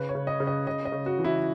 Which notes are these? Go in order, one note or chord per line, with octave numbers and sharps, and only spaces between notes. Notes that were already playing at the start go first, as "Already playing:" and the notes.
Already playing: C#3 B4
C#5
C#3
D#5
C#3
D#5
C#3 D#5
D#5
C#3
F#4
E3
E4